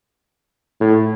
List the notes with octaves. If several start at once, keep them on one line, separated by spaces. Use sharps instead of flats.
A2